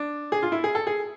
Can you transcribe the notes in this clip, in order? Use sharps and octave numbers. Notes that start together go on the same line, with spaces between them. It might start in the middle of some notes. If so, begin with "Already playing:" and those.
Already playing: D4
G#4
F4
E4
G#4
A4
G#4